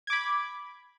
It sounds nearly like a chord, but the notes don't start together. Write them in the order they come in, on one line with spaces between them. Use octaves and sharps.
G#6 D6 B5